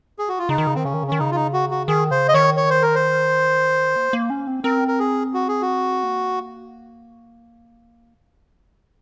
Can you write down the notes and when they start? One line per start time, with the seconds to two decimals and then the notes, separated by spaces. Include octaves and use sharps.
0.19 G#4
0.29 F#4
0.39 F4
0.49 C#3 D#4
0.58 D#3
0.67 C#3
0.75 D#3 C4
0.84 C#3 C#4
0.94 D#3
1.03 C#3
1.07 D#3 C#4
1.18 C#3 D#4
1.31 F4
1.35 D#4
1.53 F#4
1.71 F#4
1.88 D#3 G#4
2.11 C#3 C5
2.28 D#5
2.34 D#3 C#5
2.57 C#5
2.70 C5
2.82 A#4
2.95 C5
3.96 A#3
4.13 A#3
4.30 C#4
4.47 C4
4.64 C4 A#4
4.88 A#4
4.99 G#4
5.34 F#4
5.48 G#4
5.62 F#4
6.03 A#3